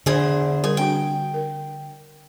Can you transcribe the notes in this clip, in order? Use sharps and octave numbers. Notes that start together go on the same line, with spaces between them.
E2 D3 G#4 C5
G3 G#4 A#4
C4 D4 F#4 G5
A#4